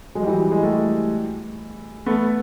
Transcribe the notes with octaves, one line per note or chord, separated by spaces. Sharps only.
F#3 G#3
G3
E3 F#3
F#3 G#3
G3 A3
A3 B3